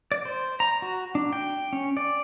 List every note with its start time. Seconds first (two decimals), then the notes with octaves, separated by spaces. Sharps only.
0.12 D5
0.25 C5
0.60 A#5
0.82 F#4
1.15 D4
1.33 G5
1.73 C#4
1.97 D5